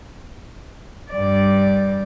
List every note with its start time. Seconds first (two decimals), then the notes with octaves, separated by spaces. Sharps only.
1.11 G2 D5